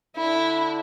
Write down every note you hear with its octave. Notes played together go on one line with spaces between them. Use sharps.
D3 E4